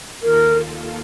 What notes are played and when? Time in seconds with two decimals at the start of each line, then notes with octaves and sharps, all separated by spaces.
0.22 D#2 D#3 A#3 F4 A4 A#4